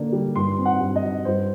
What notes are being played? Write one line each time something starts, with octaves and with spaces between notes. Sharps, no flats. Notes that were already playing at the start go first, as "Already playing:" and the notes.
Already playing: D3 A#3 D4
G3
G2 C6
C4
F#5
G2
D#5
F#3
G2 C5